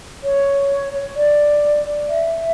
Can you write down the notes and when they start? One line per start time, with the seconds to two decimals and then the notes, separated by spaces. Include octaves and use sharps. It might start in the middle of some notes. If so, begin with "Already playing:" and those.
0.23 C#5
1.16 D5
2.09 E5